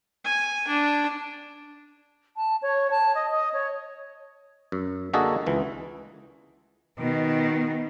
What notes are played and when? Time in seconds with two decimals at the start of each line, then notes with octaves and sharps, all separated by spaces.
0.24 G#5
0.68 D4
2.36 A5
2.62 C#5
2.91 A5
3.15 D#5
3.31 D#5
3.54 C#5
4.72 F#2
5.14 D3 A#3 F#4 G#4 A4 D#5
5.46 C#2 E3
6.99 B2 D#3